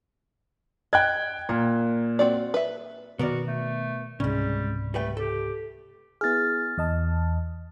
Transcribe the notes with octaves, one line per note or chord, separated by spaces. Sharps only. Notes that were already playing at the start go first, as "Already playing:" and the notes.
D#5 G5 F#6 G#6
A#2 A#3
C4 F#4 D5
B4 E5
B2 D#3 B3 F#4 A#4 D5
A3
C#2 G#2 C3 G3 G#3 C#4
G3 A3 B4 G5
G4 A4
B3 E4 G#4 F6 A6
E2 D#5 A5